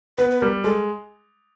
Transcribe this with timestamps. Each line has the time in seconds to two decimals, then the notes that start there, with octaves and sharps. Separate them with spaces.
0.18 B3 B4
0.31 B4
0.41 G3 A#4
0.64 G#3 A4